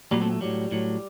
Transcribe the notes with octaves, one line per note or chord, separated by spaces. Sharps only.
A#2 F#3 G3 A#3
A3 C4
A3
A2 F#3 G3
A2 F#3